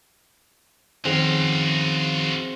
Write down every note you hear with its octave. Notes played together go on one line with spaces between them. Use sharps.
D#3 F3 C4 C#4 F#4 G#4 F5